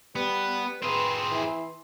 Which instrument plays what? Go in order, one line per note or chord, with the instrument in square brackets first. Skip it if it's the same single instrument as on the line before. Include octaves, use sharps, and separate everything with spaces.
[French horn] G3 [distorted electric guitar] B3 [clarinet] B4
[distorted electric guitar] C4 G#4 [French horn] B4 [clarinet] C6
[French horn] E3